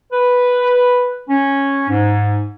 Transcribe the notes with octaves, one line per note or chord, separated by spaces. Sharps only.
B4
C#4
G#2